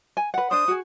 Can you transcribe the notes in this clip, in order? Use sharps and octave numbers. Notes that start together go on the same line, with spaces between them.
G#5
B4 F#5
D4 C5 D#6
F#4 G#4